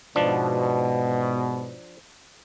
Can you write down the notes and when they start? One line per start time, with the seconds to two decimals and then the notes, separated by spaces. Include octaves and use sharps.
0.16 G#2 B2 F3 D4